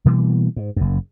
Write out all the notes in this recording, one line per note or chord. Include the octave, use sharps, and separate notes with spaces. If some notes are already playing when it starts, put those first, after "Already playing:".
B2 E3 G3 A#3
G#2
F#1 F#2